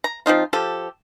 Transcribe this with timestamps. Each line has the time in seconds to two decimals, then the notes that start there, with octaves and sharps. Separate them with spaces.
0.04 A#5
0.26 F3 C4 D#4 F4
0.53 F3 G4 A4